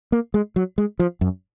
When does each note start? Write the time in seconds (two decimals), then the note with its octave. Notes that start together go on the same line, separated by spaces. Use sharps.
0.12 A#3
0.34 G#3
0.56 F#3
0.78 G#3
0.99 F3
1.21 F#2